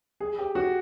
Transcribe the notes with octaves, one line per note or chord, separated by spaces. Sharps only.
G#4
G4
F#4